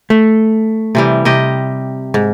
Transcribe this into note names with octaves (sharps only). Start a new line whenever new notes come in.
A3
C3 E3 G3
C3 G4 D#5
G#2